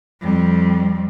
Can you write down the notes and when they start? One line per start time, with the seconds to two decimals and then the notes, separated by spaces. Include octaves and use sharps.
0.21 F2 G3